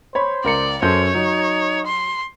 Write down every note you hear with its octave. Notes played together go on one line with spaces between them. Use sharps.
C5 C#5 B5
C#2 A#4 D5 C#7
F#2 A4 C5 C#5 G6
F#3 D#4
C6